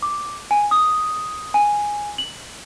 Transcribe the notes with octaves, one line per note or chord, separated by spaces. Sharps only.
D6
G#5
D#6
G#5
F#7